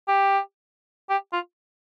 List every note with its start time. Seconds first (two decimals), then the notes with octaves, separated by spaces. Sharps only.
0.08 G4
1.10 G4
1.33 F4